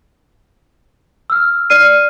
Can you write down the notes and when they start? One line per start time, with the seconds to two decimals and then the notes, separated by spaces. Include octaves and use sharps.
1.30 E6 F6
1.70 D5 F6 C7 D#7